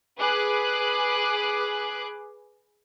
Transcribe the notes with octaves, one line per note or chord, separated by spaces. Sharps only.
G#4 B4 D6 F#6